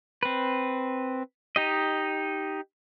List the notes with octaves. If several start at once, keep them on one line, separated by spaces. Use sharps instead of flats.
C4 B4
D#4 G4 D#5